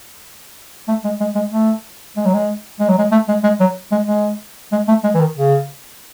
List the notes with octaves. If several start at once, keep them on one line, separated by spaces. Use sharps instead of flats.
A3
G#3
G#3
G#3
A3
G#3
F#3
G#3
G#3
F#3
G#3
A3
G#3
G#3
F#3
G#3
G#3
G#3
A3
G#3
E3
D#3
C#3